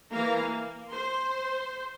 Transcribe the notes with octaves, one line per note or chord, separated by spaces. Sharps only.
E3 A#3 F5 A#5
A#3
C5 C6